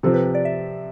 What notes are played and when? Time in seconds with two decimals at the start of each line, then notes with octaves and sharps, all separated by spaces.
0.03 C3 F3 C4 A4
0.14 B4
0.35 D5
0.45 E5